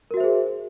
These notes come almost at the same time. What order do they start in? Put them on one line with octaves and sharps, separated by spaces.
A#4 F#4 E5 C5 G#4